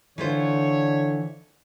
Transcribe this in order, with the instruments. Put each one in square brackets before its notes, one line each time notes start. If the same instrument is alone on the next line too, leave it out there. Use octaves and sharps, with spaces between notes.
[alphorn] D3 [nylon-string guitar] E3 F4 C5 [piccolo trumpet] C#5